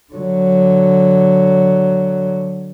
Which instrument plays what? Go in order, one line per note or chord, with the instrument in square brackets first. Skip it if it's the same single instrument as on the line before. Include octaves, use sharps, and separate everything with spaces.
[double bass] D3 F#3